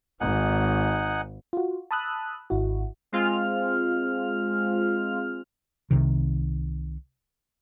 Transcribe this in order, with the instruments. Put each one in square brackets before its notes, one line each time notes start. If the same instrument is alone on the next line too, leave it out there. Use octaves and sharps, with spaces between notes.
[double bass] G#1 [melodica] D#4 F#5 G#5
[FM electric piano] F4 F#4
A5 B5 D#6 E6 F#6
G#1 E4 F#4
[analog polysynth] G#3 C4 F4 F6
[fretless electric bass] C2 C3 D#3